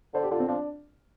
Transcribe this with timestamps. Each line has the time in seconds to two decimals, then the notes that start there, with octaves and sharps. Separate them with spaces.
0.14 D3 C5
0.23 G4
0.31 D3 F4
0.40 C4
0.48 F3 D4